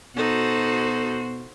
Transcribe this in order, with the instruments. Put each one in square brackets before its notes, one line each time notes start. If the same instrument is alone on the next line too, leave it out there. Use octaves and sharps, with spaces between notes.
[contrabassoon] B2 [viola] D#4 A4 [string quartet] F#4 C5